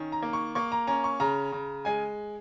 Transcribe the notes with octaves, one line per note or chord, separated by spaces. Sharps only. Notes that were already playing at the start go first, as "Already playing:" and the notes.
Already playing: D#3 C#4
A#5
A#3
C#6
A#3 C#6
A#5
C#4 A#5
C#6
C#3 A#5
C#3
G#3 G#5